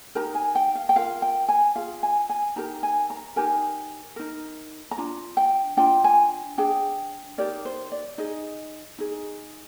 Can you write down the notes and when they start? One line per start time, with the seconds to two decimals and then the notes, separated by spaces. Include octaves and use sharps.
0.15 D#4 G4 A#4 A#5
0.35 G#5
0.55 G5
0.75 F5
0.89 G5
0.96 F4 A#4 F5
1.22 G5
1.49 G#5
1.75 F4 G#4 F5
2.03 G#5
2.29 G#5
2.56 D#4 G4 A#4 A#5
2.83 G#5
3.10 A#5
3.36 D#4 G4 A#4 G#5
4.16 D#4 A#4
4.91 A#5
4.98 D4 F4
5.37 G5
5.77 D4 F4 G5
6.04 G#5
6.58 D4 G#4 G5
7.38 D#4 G4 A#4 D5
7.65 C5
7.92 D5
8.18 D#4 G#4 D#5
8.98 D#4 G#4